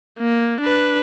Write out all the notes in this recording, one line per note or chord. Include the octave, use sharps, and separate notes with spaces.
A#3
D4 B4